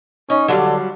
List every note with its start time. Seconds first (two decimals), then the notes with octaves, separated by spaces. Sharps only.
0.30 C#4 D#4
0.48 D3 F#3 G3 F5